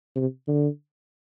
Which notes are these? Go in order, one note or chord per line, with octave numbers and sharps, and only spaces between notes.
C3
D3